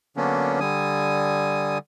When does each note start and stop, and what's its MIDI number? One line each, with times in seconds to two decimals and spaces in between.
0.17 0.60 50
0.17 0.60 54
0.17 0.60 58
0.17 0.60 59
0.17 0.60 61
0.17 0.60 62
0.60 1.78 50
0.60 1.78 55
0.60 1.78 80
0.60 1.78 87